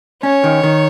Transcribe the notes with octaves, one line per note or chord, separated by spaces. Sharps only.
C#4 C#5
D#3
D#3